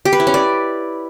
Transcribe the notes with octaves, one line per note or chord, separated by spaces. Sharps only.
G4
B4
E4
C#4
D5